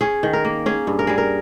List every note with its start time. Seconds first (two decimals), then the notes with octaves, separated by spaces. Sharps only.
0.01 C#4 G#4
0.23 D#3
0.33 A#4
0.45 A#3
0.66 C#4 G#4
0.87 G2
0.99 A#4
1.07 G3 G#4
1.18 A#4